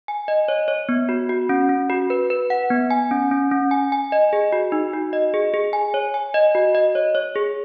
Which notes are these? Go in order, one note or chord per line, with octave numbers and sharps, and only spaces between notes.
G#5
D#5
C#5
C#5
B3
F#4
F#4
C#4
C#4
F#4
B4
B4
F#5
B3
G#5
C#4
C#4
C#4
G#5
G#5
D#5
G#4
F#4
D#4
F#4
D#5
G#4
G#4
G#5
C#5
G#5
D#5
F#4
D#5
C#5
C#5
G#4